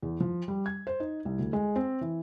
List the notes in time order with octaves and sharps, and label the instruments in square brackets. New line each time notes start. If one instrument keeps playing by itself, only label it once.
[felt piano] E2
F3
G3
G#6
C5
D#4
C2
D2
G#3
C4
E3